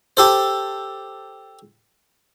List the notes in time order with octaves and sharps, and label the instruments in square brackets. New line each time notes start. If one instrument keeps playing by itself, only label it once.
[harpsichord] G4 A4 C5